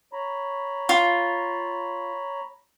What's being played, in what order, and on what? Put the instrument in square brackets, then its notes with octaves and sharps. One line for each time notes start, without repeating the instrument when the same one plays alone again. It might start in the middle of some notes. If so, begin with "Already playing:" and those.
[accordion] C#5 A#5 B5
[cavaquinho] F4